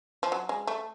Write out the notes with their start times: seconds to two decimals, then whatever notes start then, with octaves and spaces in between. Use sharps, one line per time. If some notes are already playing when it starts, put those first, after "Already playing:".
0.23 F3
0.32 F#3
0.49 G#3
0.67 A3